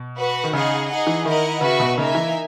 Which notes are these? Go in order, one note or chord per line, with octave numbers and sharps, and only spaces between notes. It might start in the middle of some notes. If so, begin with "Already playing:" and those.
Already playing: B2
F#4 B4 F#5
D#3
C#3 D#4 G#4 D#5 F#5
D#4 G#4 D#5 F#5
E3
D#3 E4 A#4 D#5 F#5
C#3 F#4 B4 E5
B2
C#3 A#3 D#4 A#4 E5 G#5
E3